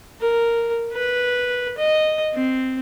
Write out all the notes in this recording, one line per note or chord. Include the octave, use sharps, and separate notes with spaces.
A#4
B4
D#5
C4